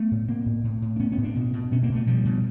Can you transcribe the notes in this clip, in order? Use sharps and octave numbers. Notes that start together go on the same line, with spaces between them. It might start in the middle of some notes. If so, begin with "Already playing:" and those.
Already playing: A3 B3
A2
A2 A#3 C4
A2
A2
A2
D4
A2 B3 C#4
B3 C#4
A2
C4 D4
B2
B2
B2 B3 C#4
A#3 C4
B2
A3 B3
B2 F3 G3
B2